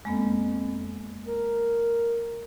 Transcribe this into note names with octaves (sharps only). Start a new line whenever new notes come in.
F2 G#3 A#3 B3
A#4